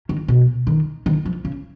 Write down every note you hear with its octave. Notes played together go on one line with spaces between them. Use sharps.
D#3
B2
D#3
D#3
F3
C#3